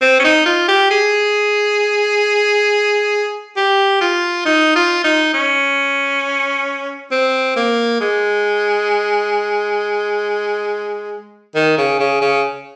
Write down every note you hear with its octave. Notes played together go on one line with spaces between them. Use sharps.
C4
C#4
D#4
F4
G4
G#4
G4
F4
D#4
F4
D#4
C#4
C4
A#3
G#3
D#3
C#3
C#3
C#3